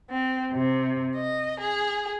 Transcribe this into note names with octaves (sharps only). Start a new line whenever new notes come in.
C4
C3
D#5
G#4